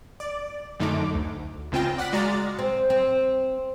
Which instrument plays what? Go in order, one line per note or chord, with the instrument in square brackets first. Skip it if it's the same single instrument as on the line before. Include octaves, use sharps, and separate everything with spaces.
[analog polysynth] D5
F#2 D3 A3 D#4 D6
D2
C#2 C#3 C4 F4 G5 A#6
D5 F#5 F#6 B6
G#3 F#4 D5 F5 A#5 A6
[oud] C4
C4